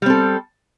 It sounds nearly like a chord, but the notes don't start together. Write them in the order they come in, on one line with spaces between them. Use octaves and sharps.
G3 C4 A4